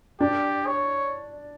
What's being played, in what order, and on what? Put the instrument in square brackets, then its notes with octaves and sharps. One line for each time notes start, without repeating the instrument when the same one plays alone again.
[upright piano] D4 [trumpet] G4
[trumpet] C#5